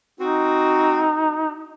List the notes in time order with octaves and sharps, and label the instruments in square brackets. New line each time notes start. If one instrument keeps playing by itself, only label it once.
[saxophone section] C4 F#4 [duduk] D#4